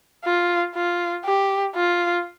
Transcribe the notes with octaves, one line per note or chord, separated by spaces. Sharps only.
F4
F4
G4
F4